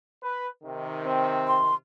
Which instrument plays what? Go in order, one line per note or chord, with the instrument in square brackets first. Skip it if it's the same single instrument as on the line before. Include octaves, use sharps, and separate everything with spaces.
[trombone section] B4
C3 D#3
[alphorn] C4
[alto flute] C6